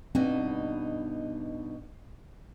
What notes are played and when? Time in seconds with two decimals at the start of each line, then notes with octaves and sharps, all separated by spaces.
0.15 G2 B2 C4 D#4